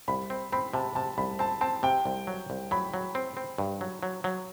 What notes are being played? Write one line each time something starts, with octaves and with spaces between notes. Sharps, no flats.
C2 B5
C4
C4 B5
C3 A5
C3 A5
C2 B5
C4 A5
C4 A5
C3 G5
C2
F#3
C2
F#3 B5
F#3
C4
C4
G2
F#3
F#3
F#3